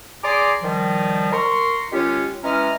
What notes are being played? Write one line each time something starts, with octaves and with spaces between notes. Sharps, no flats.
G#4 D5 A#5 C6 D6
D#3 F3 G3
A#4 C6 C#6
D#3 G#3 C#4 F4 G4 C#5
E3 G#3 C#4 D#5 A#5 F6